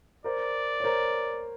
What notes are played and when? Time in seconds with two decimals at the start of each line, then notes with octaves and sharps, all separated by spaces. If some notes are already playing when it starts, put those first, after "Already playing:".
0.24 A#4 C5 D5
0.80 C#5
0.84 A#4 C5